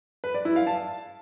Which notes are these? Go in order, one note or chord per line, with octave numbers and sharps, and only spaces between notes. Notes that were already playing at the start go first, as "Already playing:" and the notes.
B4
D5
E4
F5
A5